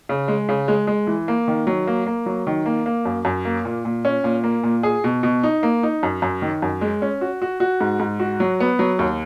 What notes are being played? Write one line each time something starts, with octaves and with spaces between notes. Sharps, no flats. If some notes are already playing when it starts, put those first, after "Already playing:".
C#3
G#3
C#3
G#3
G#3
E3
A#3
D#3
F#3
A#3
A#3
F#3
D#3
A#3
A#3
F#2
F#2
A#3
A#2
A#2
C#4
A#2
A#3
A#2
G#4
B2
B2
D#4
A#3
D#4
F#2
F#2
D#3
F#2
G#3
C#4
F#4
F#4
F#4
G#2
G#2
F#4
F#3
B3
F#3
D#2